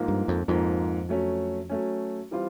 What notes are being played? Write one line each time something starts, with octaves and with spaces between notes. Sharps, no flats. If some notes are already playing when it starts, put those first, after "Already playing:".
Already playing: G#2 F3 A#3
G2
F2
F2 G#2 F3 A#3
F#3 A3 C#4
F#3 A3 C#4
E3 G3 C4 F4